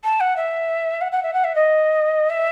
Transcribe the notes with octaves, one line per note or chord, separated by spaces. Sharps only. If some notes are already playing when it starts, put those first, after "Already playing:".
A5
F#5
E5
F#5
F#5
E5
F#5
E5
D#5
E5